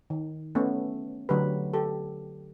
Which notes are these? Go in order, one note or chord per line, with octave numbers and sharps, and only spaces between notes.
D#3
A3 B3 C#4
D3 F#3 A3 G4 B4
G4 A4